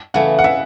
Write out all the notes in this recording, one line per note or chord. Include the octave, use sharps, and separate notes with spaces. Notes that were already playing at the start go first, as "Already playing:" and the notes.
C#3 E3 A3 F#5
F#5
C#3 E5